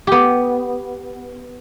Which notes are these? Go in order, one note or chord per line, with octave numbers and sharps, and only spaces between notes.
B3 G4